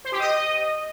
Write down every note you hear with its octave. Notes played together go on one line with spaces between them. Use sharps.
C5
G4
D#5